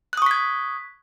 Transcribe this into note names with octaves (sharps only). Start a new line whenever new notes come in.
C#6 D#6 F#6 G#6 B6